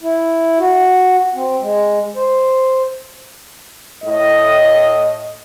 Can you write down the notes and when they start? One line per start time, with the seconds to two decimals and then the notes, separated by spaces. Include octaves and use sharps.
0.01 E4
0.59 F#4
1.35 C4
1.61 G#3
2.16 C5
4.03 A2 D#5